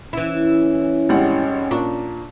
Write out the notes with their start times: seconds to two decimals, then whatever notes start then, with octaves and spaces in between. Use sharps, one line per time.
0.13 E3 C#4 E4
1.09 G#1 G3 F#5
1.71 A#2 D4 C#6